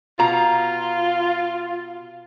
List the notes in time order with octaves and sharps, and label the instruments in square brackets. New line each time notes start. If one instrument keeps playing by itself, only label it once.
[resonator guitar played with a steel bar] B2 A#5 [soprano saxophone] F4